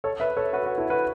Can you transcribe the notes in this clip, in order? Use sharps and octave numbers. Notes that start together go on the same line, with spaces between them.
A4 C#5
B4 E5
A4 C#5
F#4 B4
F#4 B4
E4 A4
F#4 B4